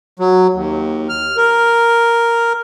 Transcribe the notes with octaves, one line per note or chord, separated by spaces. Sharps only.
F#3
D#2
F6
A#4